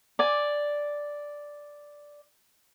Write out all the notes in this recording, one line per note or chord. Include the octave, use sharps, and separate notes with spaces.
D5 G#5